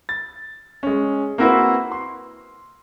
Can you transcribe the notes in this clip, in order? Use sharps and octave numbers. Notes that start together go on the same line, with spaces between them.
A6
G#3 C#4
A#3 C4 E4 F#4 B4
C6